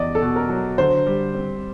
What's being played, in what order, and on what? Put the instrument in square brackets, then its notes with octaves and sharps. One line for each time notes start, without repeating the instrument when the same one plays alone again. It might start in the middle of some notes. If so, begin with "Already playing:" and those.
Already playing: [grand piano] E2 [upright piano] D5 D#5
[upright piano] A4
[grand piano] B2
[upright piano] A#4
[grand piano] F#3
[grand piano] D3 [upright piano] C5
[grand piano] G3
C4